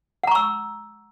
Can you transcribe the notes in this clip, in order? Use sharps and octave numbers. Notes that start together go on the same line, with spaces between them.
F#5 A#5 C#6 E6